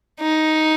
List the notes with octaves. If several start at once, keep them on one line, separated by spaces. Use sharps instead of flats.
D#4